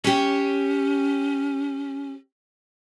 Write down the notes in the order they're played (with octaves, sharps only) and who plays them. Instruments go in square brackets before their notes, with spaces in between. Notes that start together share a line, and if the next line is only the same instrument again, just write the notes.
[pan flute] C#4 [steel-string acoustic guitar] G4 C#5